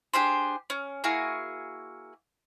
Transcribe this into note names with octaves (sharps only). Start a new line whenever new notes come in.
D4 G4 G#4 C5
C#4
A#3 E4 F#4 G#4